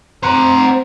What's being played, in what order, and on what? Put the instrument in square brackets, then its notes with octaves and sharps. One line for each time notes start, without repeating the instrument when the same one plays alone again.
[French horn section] C4 [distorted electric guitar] C5 F#5 [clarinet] A#5